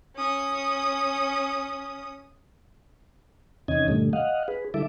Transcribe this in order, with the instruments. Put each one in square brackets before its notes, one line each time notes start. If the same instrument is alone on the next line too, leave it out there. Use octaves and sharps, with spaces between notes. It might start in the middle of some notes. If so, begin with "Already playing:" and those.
[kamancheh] C#4 D#6
[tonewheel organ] E2 C3 D#3 C#4 D#5 G#6
G2 A#2 D3 G3 A3
D#5 F5 F#5
G#4 B4
D3 G3 E4 A4 E5 D6